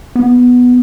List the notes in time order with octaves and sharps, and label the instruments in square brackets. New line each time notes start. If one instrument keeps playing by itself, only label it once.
[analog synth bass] B3